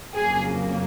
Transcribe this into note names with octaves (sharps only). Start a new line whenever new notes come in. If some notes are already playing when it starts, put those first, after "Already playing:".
F2 C#3 F#3 A#3 G#4